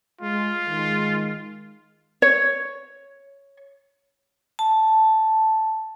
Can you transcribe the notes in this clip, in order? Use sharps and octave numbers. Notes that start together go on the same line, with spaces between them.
G#3 F4
D#3 G#3
C#5
A5